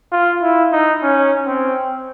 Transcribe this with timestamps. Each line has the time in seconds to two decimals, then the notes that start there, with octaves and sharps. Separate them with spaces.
0.12 F4
0.42 E4
0.72 D#4
1.03 C#4
1.47 C4